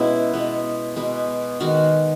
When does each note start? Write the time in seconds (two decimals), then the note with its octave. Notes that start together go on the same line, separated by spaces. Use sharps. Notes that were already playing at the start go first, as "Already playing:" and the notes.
Already playing: B2 G#3 B3 C#4 E4
0.34 B2 G#3 B3
0.96 B2 G#3 B3
1.60 D#3 G#3 B3 F#4